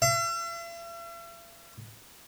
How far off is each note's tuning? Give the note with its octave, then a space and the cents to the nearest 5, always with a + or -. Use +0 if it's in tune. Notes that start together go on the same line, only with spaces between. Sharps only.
E5 +45